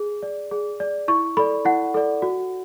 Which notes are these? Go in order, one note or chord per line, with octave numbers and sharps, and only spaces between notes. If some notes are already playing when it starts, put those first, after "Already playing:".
Already playing: G#4
D5
G#4
D5
E4 C#6
A4 D5 B5
E4 F#5
A4 D5
F#4